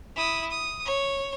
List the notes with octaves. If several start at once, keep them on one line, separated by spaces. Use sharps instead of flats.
E4 D#6
D#6
C#5